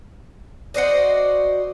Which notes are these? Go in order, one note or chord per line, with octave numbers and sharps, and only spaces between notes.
F#4 C5 D5 D#5